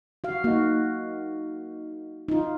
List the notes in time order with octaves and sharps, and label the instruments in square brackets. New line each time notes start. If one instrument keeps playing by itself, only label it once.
[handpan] F#4 F5
[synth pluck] A#3 D#4 [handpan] F#4
[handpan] D#4 F4